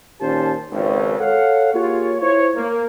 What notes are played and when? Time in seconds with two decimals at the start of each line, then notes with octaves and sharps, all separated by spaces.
0.21 A#2 D#3 C#4 G4 C5 A5
0.71 G#1 C#2
1.19 A4 C#5 F5 F#5
1.74 A#3 F4 G4 G#4 C#5
2.21 E4 C5 C#5
2.56 A#3